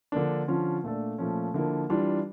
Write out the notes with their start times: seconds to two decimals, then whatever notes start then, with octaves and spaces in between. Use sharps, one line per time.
0.12 D3 F3 A#3 D4
0.48 D3 F3 C#4 F4
0.83 A#2 A3 D4 A4
1.18 A#2 F3 A3 C#4
1.54 D3 F3 A#3 E4
1.90 E3 G3 D4 F4